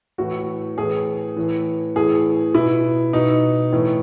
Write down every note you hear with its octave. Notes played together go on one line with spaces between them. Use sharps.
A2 E3 F#4
A2 E3 G#4
A2 E3
A2 E3 G#4
B2 E4
B2 D#4
A2 E3